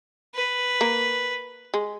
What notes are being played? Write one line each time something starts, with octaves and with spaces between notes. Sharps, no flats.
B4
A#3
G#3